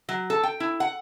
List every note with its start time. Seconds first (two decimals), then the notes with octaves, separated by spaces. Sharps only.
0.09 F#3
0.30 A4
0.43 G5
0.60 E4
0.80 F#5